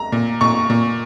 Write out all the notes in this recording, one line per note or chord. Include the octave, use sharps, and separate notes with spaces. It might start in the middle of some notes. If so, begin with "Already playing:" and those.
Already playing: A#5
A#2
A#2 C#6
A#2